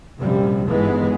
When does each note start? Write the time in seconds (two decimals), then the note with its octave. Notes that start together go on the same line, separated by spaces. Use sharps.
0.19 A#1 F#2 C3 F3 G3
0.68 G#1 G2 E3 G#3 B3